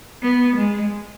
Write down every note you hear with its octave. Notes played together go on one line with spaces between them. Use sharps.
B3
G#3